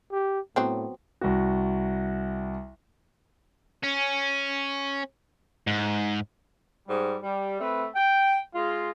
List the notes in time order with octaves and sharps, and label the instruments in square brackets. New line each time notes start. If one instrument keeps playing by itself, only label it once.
[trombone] G4
[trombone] A2 [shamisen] F#3 B3 C4
[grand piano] C2 F#4
[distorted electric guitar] C#4
G#2
[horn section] G#2 G3
G3
A3 C4 B4
G5
G#3 F4